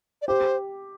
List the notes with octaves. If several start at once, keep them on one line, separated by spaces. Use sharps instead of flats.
D5
G4 C5